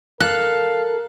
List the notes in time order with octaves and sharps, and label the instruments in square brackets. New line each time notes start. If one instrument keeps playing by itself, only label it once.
[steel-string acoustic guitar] A4 [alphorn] A#4 [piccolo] F5 [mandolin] F#6